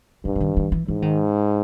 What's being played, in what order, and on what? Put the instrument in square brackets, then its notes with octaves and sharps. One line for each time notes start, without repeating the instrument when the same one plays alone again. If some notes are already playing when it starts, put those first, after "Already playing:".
[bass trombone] G2 [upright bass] D3
[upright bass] D3
D#3
D#3
E3
[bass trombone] G#2 [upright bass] E3
[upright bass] D#3